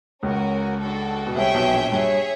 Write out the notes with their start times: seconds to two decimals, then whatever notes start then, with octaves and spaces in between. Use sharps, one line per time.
0.23 C#2 C#3 C#4 F#4 A#4
0.79 D4 F#4 A4
1.27 B2
1.35 C2 C3 G#4 C#5 E5 G5
1.54 B1 B2
1.73 A#1 A#2
1.91 G2 G#4 C#5 E5